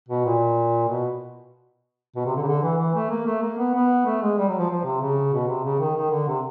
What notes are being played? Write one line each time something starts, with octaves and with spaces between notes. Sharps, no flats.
B2
A#2
B2
B2
C3
D3
C#3
D3
E3
E3
A3
A#3
A3
A#3
B3
B3
A3
G#3
G3
F#3
F3
F3
C3
C#3
B2
C3
C#3
D#3
D#3
D3
C3